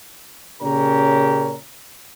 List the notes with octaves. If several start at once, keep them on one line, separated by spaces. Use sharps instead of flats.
A#2 C#3 C#4 G4 A#4 A#5